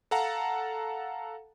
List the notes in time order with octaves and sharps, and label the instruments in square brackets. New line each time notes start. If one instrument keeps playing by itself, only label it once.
[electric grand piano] A4 F5 F#5 A5 A#5